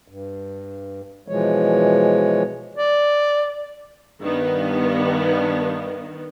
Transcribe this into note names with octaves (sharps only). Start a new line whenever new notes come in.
G2
B2 E3 F3 G#3 C#5
D5
G2 D#3 B3